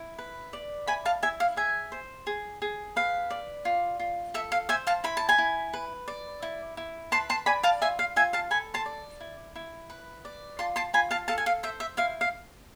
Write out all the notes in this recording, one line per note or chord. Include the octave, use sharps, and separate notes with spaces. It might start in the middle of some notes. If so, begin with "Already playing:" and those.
Already playing: E4
B4
D5
E4 G#5 B5
F5 A5
E4 E5 G#5
F5
G#4 E5 G#5
C5
G#4
G#4
B4 F5
D5
F4
F4
A4 E5
F5
C5 E5 G#5
F5 A5
E4 B5
A5
G#5 B5
E4
B4
D5
E4
E4
B4 A5 C6
A5 C6
D5 G#5 B5
F5 A5
F4 E5 G#5
F5
F4 E5 G#5
F5 A5
A4 G#5 B5
A5 C6
D5
E4
E4
B4
D5
F4 A5 C6
A5 C6
F4 G#5 B5
F5 A5
A4 F5 A5
G#5
F5
C5 E5
E5
E4 F5
F5